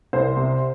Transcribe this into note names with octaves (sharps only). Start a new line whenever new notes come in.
C2 C5
C3